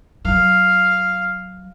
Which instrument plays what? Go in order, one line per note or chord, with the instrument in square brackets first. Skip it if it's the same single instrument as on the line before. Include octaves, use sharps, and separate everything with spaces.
[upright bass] F#3 [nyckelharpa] F5